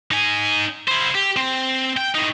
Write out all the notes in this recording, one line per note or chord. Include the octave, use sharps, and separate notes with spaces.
D#4 G#5
E4 C5
G4
C4
G5
A2 D#4